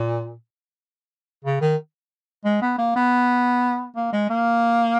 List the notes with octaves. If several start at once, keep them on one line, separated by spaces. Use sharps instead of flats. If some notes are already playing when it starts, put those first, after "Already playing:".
Already playing: A#2
C#3
D#3
G#3
B3
A#3
B3
A#3
G#3
A#3